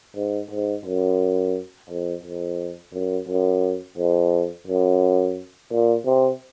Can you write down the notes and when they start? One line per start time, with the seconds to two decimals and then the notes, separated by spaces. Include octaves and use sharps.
0.16 G#2
0.51 G#2
0.85 F#2
1.90 F2
2.24 F2
2.94 F#2
3.28 F#2
3.98 F2
4.67 F#2
5.71 A#2
6.06 C3